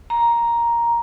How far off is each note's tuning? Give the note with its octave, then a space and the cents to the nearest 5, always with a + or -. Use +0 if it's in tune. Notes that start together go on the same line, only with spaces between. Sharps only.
A#5 +5